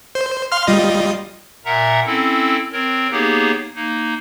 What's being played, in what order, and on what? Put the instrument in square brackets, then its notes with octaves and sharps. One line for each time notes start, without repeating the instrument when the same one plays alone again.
[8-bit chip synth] C5
F5 C6 F6
G3 F4 D#5
[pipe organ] A#2 A#4 E5 F#5 A#5
C4 C#4 E4 A4
C4 A#4 C#5
A#3 B3 D#4 G4 G#4 C#5
A#3 D#4